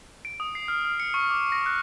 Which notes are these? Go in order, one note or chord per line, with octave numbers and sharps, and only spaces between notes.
D7
D#6
C7
F6
F6
C#7
C#6
D6
A#6
F#6